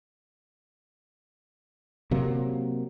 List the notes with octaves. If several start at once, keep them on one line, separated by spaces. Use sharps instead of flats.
C3 F#3 A#3